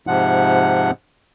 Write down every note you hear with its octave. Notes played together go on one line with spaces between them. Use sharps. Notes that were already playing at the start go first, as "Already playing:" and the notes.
G#2 C3 F3 F#5